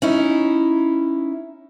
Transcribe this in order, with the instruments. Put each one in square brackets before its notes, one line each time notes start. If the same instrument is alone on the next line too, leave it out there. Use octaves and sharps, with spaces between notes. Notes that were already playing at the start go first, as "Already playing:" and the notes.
[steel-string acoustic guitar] C#4 D#4 E4